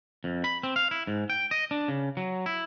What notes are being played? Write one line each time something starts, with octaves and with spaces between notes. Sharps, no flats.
F2
B5
C4
F5
E4
G#2
G5
D#5
D4
C#3
F#3
E4